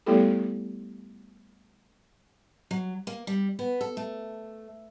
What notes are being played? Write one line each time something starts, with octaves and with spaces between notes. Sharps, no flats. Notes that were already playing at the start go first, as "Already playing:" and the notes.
G3 A3 B3 E4 G4 A4
F#3
A#3
G3
B3
A4
A3